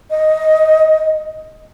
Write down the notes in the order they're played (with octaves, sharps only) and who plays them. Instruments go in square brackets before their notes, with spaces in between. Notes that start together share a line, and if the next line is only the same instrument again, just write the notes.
[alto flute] D#5